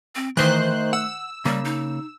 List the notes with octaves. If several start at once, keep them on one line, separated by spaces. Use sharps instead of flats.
C4
D#3 E3 A3 C5 F#6
F#5 E6
C#3 G3 A#3
D#4